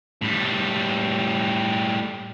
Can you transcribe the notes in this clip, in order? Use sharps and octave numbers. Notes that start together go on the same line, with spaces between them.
A2 G3